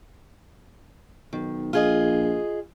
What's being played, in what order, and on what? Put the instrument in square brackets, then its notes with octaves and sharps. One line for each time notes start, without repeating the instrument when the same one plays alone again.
[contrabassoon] B1 [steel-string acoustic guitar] D#3
[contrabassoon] A#1 [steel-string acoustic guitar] F4 G#4 D#5